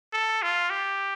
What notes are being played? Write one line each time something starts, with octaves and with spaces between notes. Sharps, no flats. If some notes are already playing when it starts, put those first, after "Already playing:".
A4
F4
G4